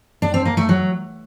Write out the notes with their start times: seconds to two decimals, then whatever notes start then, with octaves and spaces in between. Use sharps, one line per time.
0.22 D4
0.34 C4
0.45 A#3
0.57 A3
0.69 F#3